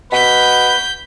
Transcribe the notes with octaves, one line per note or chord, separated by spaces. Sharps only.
B2 B4 G6 B6